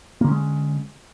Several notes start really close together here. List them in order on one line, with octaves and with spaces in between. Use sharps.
A#3 D3 C#4 G#3